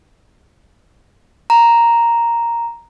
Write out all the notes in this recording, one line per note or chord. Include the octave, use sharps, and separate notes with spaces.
A#5